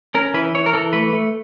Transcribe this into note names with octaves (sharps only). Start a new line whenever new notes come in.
C#4 A#4
E3 B4
E3 C#5
A#4
E3 A4
A3 B4
A3